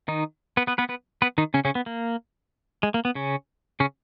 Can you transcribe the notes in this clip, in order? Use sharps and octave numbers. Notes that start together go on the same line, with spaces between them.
D#3 D#4
B3 B4
B3 B4
B3 B4
B3 B4
B3 B4
D#3 D#4
C#3 C#4
C#3 C#4
B3
A#3
G#3
A#3
B3
C#3 C#4
C#3 C#4